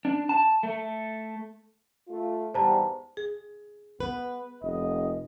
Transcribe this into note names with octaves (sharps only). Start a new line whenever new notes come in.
D4
A5
A3
A3 F4
E2 G#2 G3 C5 A5 A#5
G#4
B3 B4
F1 D#5